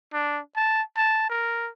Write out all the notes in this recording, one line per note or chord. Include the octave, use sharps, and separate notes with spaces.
D4
A5
A5
A#4